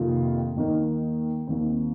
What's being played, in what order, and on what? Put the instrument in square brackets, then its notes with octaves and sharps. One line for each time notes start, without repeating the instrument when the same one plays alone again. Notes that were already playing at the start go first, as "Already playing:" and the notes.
Already playing: [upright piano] F2 C3 D#3 A#3 F4
D#2 D#3 A#3 D#4
D#2 D#3 C4